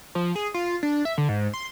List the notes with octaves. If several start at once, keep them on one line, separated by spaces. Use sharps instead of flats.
F3
G#4
F4
D4
E5
D3
G#2
C6